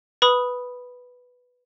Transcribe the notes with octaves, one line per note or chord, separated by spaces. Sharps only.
B4 B5 D#6